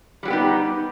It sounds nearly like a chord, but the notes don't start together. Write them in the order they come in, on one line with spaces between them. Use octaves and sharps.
G3 F#3 G4 B3 D#4